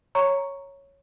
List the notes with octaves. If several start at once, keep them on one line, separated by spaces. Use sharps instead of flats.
C#5 A#5 C#6